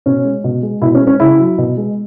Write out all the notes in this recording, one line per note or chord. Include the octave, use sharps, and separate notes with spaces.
B2 C#4
G#3
B2
G#3
B2 E4
C#4
G#3
C#4
C#3 E4
F#3
B2
G#3